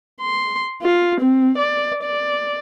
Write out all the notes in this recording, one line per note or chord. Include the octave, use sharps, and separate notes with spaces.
C6
F4
C4
D5
D5